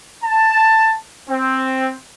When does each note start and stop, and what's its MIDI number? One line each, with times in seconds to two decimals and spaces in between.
0.25 0.96 81
1.30 1.92 60